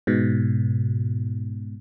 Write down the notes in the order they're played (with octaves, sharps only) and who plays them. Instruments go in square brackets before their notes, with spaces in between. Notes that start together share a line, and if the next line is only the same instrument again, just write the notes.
[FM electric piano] G#2 B2